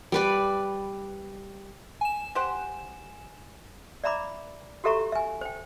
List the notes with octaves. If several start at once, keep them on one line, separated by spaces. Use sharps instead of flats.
G3 B4 D5
G#5 E7
G4 C5 F#5
D5 E5 A#5 B5 D6
F#4 G4 A4 E5 A#5 C#6
E5 G#5
C5 G5